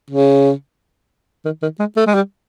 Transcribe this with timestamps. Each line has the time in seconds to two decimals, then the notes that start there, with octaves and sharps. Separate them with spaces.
0.10 C#3
1.45 D#3
1.62 D#3
1.79 G#3
1.96 A3
2.06 G#3
2.14 G3